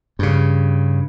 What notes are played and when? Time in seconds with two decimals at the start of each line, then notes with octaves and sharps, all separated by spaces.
0.19 G2 C#3